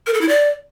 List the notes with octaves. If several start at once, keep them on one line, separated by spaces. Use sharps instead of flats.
A#4
A4
E4
D5